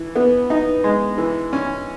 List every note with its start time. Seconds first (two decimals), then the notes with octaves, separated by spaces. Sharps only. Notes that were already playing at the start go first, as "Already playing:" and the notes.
Already playing: E3
0.16 B3
0.50 D#4
0.84 G#3
1.18 E3
1.53 C#4